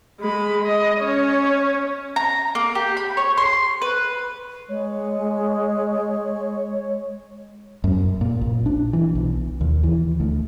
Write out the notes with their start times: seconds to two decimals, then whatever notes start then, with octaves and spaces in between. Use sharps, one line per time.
0.20 G#3 B5
0.66 D#5
1.01 C#4 C#5
2.16 A#5
2.55 A#3
2.75 G4
2.97 B5
3.17 C#5
3.37 C6
3.82 B4
4.69 G#3 C#5
7.84 F#2
8.21 A#2
8.41 A#1
8.66 D4
8.93 E3
9.15 B1
9.61 D#2
9.83 E3
10.20 D2